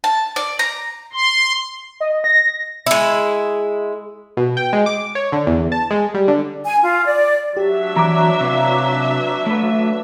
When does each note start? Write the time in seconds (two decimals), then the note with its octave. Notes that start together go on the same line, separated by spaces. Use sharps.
0.04 A5
0.36 D5
0.59 A#5
1.13 C6
2.00 D#5
2.24 A#6
2.86 G#3 E4
4.37 B2
4.57 G5
4.73 G#3
4.86 D6
5.15 C#5
5.32 D3
5.47 E2
5.72 A5
5.90 G#3
6.14 G3
6.28 D3
6.65 G#5
6.83 F4
7.05 D5
7.57 F#3 D4 G4 E5
7.96 E3 C#5 D5 A#5 D6
8.41 C3 B4 F5
9.46 A3 B4